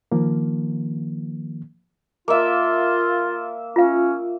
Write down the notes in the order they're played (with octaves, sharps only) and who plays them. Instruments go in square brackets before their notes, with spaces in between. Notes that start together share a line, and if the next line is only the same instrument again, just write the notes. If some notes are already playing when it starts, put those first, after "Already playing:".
[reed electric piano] D#3 F3 A#3
[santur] A#3 E5 [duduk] F4
[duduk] C#4 [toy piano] F4 F5